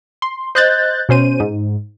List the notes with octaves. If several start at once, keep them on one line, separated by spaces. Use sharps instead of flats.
C6
C5 D#5 F#6 G6 A6
B2 C#4 C5 D#7
G#2